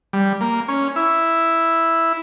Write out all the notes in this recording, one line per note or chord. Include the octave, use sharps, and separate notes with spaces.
G3
A#3
C#4
E4